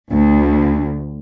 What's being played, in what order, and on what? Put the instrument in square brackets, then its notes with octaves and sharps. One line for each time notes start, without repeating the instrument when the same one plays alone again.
[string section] D2